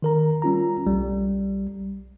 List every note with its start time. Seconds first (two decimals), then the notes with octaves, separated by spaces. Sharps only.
0.02 D#3 A#4 A#5
0.42 G3 C#4 F4 A#5
0.86 B1 G3